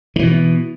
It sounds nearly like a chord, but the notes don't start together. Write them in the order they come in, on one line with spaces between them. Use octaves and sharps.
D#3 E3 B2